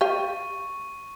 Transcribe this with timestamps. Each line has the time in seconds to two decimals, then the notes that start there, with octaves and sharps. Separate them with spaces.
0.01 G4 F5 C#6